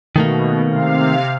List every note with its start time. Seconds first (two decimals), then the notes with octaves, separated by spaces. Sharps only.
0.16 B2 D#3 A3 A#3
0.68 C3 F5